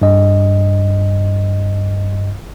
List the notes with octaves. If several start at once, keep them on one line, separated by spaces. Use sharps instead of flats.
G2 D#5